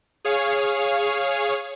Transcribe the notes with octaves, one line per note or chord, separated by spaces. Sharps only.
G#4 C#5 F5